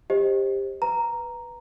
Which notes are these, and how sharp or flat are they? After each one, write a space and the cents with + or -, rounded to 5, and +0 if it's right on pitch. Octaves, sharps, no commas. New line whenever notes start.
G4 +15 C5 +15 D#5 +0
B4 -5 A#5 +0